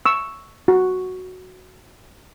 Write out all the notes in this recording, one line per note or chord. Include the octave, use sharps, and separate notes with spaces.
C#6 E6
F#4